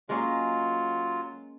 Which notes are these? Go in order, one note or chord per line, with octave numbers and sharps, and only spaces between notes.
F#3 G#3 A#3 C#4 F4